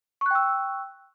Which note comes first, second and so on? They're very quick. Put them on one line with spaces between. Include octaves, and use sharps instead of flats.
C#6 F#6 G5 E6